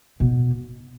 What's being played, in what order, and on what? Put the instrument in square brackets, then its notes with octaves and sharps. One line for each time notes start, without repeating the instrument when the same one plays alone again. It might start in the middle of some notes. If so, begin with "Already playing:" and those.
[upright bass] B2